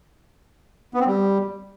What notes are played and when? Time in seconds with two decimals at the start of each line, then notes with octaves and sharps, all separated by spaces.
0.94 B3
1.00 C4
1.07 G3